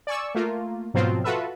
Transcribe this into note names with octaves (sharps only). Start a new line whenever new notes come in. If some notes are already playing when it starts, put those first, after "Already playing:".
D5 G#5 C#6 E6
A3 A#3 F4
G#2 B2 F3 F#3 C4 F4
F4 F#4 A4 B4 E5